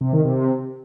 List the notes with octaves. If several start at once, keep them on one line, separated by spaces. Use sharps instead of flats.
C3
D#3
C3